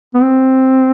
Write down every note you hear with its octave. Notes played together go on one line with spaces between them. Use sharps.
B3
C4